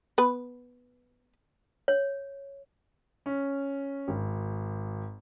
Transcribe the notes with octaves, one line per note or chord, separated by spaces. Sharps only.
B3 B4
C#5
C#4
G#1